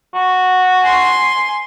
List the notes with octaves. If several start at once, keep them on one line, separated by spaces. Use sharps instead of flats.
F#4
G#5 C6